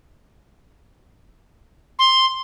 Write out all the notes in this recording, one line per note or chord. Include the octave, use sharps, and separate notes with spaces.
C6